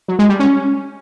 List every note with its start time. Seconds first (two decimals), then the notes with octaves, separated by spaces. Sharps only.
0.08 F#3
0.19 G#3
0.29 G3
0.40 C#4